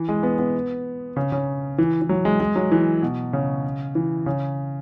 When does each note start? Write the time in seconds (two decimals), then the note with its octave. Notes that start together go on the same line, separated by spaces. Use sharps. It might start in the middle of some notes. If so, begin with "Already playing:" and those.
Already playing: E3
0.09 G#3
0.23 B3
0.39 B3
1.17 C#3
1.32 C#3
1.78 E3
2.02 E3
2.09 F#3
2.25 G#3
2.40 G#3
2.56 F#3
2.72 E3
3.02 B2
3.33 C#3
3.95 E3
4.26 C#3